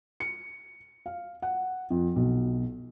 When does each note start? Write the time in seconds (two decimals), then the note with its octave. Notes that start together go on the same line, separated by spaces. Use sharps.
0.20 C#7
1.06 F5
1.42 F#5
1.90 F2
2.16 B1